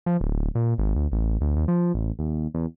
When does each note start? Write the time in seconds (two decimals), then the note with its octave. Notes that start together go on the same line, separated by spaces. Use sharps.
0.06 F3
0.21 D1
0.55 A#2
0.78 G#1
0.96 D2
1.12 A1
1.41 D2
1.56 D#2
1.68 F3
1.94 A1
2.19 D#2
2.54 E2